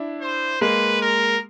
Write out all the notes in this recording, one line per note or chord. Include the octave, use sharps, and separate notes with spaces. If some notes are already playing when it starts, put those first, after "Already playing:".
Already playing: D4 E4
C5
G#3 A#3 B4
A#4